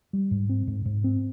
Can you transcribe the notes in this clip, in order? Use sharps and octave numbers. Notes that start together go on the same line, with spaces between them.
G3
G#2
C4
G#2
G#2
C4